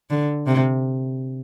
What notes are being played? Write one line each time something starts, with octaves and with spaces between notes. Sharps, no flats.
D3
C3